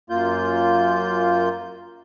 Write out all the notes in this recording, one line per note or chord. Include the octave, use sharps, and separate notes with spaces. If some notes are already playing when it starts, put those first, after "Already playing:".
F#2 A#3 F4 G6